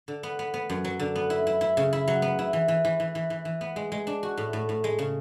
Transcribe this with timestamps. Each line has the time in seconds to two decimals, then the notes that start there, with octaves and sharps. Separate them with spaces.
0.08 D3
0.23 B3
0.39 B3
0.54 B3
0.70 F#2
0.84 F#3
1.00 D3
1.16 B3
1.30 E4
1.47 E4
1.61 E4
1.77 C#3
1.93 E4
2.08 F#3
2.22 B3
2.39 E4
2.53 E3
2.68 E3
2.85 E3
3.00 E3
3.15 E3
3.30 E3
3.45 E3
3.61 B3
3.76 G#3
3.92 G#3
4.07 D4
4.23 F#4
4.37 A2
4.53 A2
4.69 A2
4.84 G#3
4.99 C#3